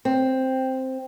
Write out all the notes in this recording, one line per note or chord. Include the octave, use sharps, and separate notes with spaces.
C4